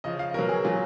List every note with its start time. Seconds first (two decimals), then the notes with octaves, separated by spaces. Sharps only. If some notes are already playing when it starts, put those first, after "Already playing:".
0.04 C#3 F3 D#5
0.19 F5
0.34 B2 F#3 A#4
0.49 G#4
0.64 A#2 F#3